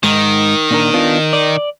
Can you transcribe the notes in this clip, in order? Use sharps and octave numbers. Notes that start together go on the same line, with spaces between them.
G#2 D#3
A#2 D4 A#4
B3 D4 F4
D5